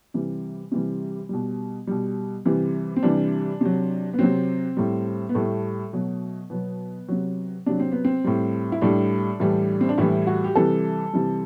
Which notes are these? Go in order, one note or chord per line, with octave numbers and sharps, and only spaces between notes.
C3 E3 G3
C3 E3 G3
B2 G3
B2 G3
C3 E3 G3
C4
C3 E3 G3 D4
C3 F#3
B3
C3 F#3 C4
A2 G3
B3
A2 G3 A3
B2 F#3
B2 F#3 B3
C3 F#3
C3 F#3 D4
C4
B3
C4
A2 G3
E4
A2 G3 D4
A2 E3 G3
C4
D4
A2 E3 G3 E4
F#4
G4
C3 E3 G3 A4
C3 E3 G3